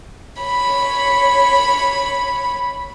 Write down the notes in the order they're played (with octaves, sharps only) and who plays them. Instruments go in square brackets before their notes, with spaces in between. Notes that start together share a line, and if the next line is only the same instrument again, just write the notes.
[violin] C#5 B5